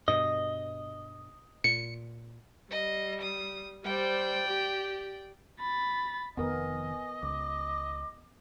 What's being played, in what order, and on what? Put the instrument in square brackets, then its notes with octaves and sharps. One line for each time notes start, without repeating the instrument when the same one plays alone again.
[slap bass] G2 B2 [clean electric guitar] D#5
[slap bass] A#2 [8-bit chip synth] C#7
[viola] G3 [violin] D#5
[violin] D#6
[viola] G3 C5 [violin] D5 G5
[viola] G4
[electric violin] B5 A6
[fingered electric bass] F1 F2 D#3 [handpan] B3 A#4 [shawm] D#5 [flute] G#5
[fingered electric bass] C#2 [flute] D6